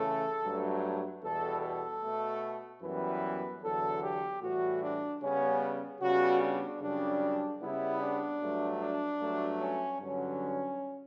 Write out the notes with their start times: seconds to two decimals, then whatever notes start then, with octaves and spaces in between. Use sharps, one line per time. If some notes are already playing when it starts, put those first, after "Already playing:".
Already playing: C#3 E3 A3 A4
0.43 G2 F#3 A3
1.22 E2 B2 G3 A4
1.62 A4
2.02 B2 A3
2.82 F#2 E3 G3 B3 B4
3.62 E2 D3 F#3 A4
4.02 G4
4.42 A2 E3 G3 F#4
4.81 D4
5.21 C#3 G3 B3 C#4
6.01 C#3 G3 B3 F#4
6.41 D4
6.81 F#2 C#3 G3 D4
7.61 C#3 G3 B3 E4
8.01 D4
8.41 G2 F#3 A3
8.81 D4
9.21 G2 F#3 A3
9.61 C#4
10.00 G2 D3 F#3 C#4